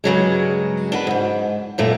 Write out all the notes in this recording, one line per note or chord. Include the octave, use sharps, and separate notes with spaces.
G2 C#3 F#3 G#3
D4 F#4 B4
D#2 G#2
F#2 A#2 A3